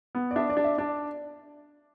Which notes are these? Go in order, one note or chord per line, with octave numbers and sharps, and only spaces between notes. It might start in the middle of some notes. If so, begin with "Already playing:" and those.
B3
D5
D4 E5
D5
D4
E5
D4 D5